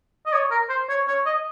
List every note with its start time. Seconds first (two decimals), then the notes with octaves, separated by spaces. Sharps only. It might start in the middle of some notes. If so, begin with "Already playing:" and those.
0.26 D#5
0.33 C#5
0.51 A#4
0.69 C5
0.89 C#5
1.07 C#5
1.26 D#5